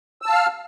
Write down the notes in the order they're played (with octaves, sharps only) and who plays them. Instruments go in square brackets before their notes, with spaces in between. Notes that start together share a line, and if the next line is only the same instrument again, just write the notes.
[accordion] E6
A5
F5
F6